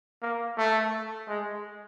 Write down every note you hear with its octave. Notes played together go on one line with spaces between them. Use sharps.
A#3
A3
G#3